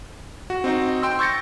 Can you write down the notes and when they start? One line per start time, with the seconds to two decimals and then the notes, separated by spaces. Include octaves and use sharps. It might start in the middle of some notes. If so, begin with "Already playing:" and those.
0.50 F#4
0.64 C4 D#4 F#4
1.03 G5 C6 E6
1.19 C#6 E6 G6 A6 A#6 C#7